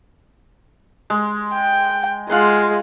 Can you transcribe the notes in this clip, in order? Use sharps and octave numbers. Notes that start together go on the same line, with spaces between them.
G#3
G5
G#3 F4 F#5 C6